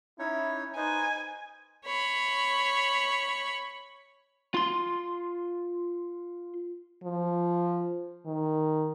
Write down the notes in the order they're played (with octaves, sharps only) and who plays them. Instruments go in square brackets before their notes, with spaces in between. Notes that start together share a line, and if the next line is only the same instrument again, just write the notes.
[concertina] C#4 D#4 C#5 [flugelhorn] E4
[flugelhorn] D#4 [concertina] B4 C5 [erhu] G#5
[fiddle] C#5 B5
[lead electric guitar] F4 C6
[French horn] F3
D#3